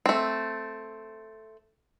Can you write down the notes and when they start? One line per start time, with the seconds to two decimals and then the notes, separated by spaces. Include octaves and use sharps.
0.06 A3 C4